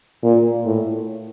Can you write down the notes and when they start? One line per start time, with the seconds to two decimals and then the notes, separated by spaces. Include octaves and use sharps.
0.23 A#2
0.65 A2